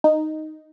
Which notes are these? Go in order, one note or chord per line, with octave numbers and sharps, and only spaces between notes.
D#4